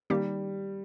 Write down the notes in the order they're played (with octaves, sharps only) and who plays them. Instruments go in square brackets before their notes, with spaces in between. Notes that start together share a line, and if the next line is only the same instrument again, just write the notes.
[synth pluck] D#3 A#3 D#4 G4 [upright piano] G3